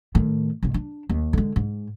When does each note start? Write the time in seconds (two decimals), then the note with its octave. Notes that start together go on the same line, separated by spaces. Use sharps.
0.15 A2 D#3
0.63 G1 B2
0.74 D4
1.09 D#2
1.33 D3 G#3
1.56 G#2